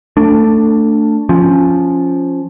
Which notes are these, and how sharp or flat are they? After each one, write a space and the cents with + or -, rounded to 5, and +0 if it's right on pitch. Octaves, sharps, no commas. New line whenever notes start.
A3 +20 D4 +0
F3 +0 C#4 +0